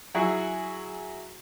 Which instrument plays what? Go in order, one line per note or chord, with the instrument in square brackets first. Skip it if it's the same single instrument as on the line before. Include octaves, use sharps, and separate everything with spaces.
[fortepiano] F#3 E4 F#4 G#4